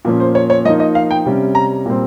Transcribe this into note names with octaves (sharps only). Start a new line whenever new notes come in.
A#2 F3 A#3 C#4
C5
C#5
C#5
F3 A#3 D#4 D#5
D#5
F5
G5
C3 G3 C#4
A#5
A#2 G3 C4